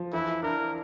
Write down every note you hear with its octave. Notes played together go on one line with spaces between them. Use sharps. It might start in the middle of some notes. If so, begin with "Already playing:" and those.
Already playing: F3
E3 E4
D4 A#4